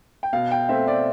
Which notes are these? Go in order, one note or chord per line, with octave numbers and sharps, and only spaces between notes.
G5
B2 F5
G5
A3 C4 E5
D5